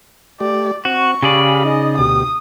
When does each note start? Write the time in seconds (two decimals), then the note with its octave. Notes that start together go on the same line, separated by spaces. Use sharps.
0.40 A3 G4 D5
0.85 C4 F#4 C#6
1.22 C#3 G4 G#4 D5 F5 B5
1.65 D#4 D#5
1.98 D2 B2 G4 D#6